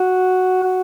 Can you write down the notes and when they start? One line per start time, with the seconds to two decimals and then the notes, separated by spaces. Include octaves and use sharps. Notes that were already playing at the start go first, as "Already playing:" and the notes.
Already playing: F#4
0.63 F#4